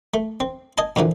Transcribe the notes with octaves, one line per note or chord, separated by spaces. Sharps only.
A3
C4
D#5 G#5 A5
A#2 D3 E3 F3